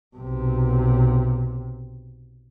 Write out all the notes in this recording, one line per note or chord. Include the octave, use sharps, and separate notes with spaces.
B1 C3